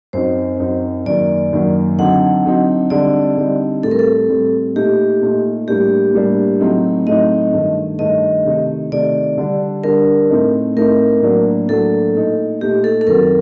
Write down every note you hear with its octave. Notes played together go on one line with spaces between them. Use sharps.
F#2 F#3 C4 D#4 C5
F#2 F#3 C4 D#4
F#2 D#3 F#3 A#3 D5
F#2 D#3 F#3 A#3
D3 F#3 C4 D#4 F#5
D3 F#3 C4 D#4
D3 G3 C4 D#4 D5
D3 G3 C4 D#4
A2 G3 C4 A4
A#4
A4
A2 G3 C4
A#2 A3 D#4 G4
A#2 A3 D#4
A2 G3 A#3 D4 G4
A2 G3 A#3 D4
A2 F#3 A3 C4 D#4
A2 F#3 A3 C4 D#4 D#5
G2 D#3 A3
G2 D#3 A3 D#5
C3 D#3 A3 D#4
C3 D#3 A3 D#4 D5
D3 G3 D4
D3 G3 D4 A#4
A2 A3 C4 D#4
A2 A3 C4 D#4 A#4
A2 F#3 A#3 D4
A2 F#3 A#3 D4 A4
A#2 A3 D#4
A#2 A3 D#4 G4
A4
A4
F#2 D#3 F#3 C4 A#4